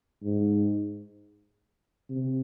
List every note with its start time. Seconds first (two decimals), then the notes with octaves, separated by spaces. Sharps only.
0.23 G#2
2.10 C3